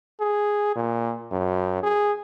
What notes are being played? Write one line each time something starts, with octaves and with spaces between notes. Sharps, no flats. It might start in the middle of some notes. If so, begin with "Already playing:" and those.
G#4
A#2
F#2
G#4